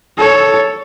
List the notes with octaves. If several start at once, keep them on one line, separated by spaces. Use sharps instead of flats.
A4 C#5